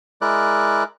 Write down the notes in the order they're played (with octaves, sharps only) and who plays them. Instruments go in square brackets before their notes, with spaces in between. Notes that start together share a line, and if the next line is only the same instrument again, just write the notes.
[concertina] G#3 E4 A#4 D5 F#6